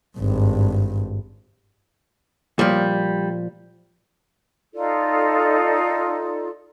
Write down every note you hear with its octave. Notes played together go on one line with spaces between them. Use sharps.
G#1 G2
A#2 F3 G3
D#4 F4 A4 D5